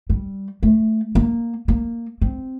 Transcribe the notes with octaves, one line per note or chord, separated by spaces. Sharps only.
G3
A3
A#3
A#3
C4